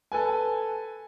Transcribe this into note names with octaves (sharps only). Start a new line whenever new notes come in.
A4 B4 G#5